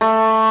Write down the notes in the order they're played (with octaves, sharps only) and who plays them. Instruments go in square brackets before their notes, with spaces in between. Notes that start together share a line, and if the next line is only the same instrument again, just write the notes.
[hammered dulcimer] A3